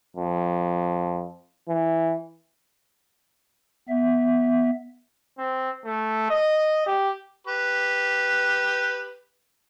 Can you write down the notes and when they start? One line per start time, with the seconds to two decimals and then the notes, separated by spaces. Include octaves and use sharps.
0.16 F2
1.69 E3
3.89 B3 E5
5.38 C4
5.85 A3
6.30 D#5
6.87 G4
7.47 G4 B4